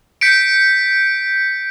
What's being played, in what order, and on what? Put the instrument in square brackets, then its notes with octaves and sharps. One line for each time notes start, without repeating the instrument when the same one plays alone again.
[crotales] G6 B6 C#7 D7